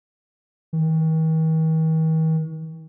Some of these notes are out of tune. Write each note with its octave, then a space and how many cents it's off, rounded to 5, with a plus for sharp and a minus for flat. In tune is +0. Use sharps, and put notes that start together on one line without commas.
D#3 +45